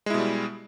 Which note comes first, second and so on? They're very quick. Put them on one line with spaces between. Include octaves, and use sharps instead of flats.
G#3 E4 B2 G3